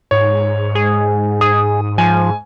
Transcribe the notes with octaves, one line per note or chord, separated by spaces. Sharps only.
G#2 C#5
G#4
G#4 D#6
F3 G#5